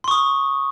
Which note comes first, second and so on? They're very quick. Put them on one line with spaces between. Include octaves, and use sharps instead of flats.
C6 C#6 D#6